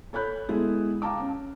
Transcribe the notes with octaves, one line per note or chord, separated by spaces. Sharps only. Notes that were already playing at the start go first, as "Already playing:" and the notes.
A4 C#5 B5 F#6 G6
G#3 B3 E4 G#4 A4
F5 G5 A5 A#5 D6
C#4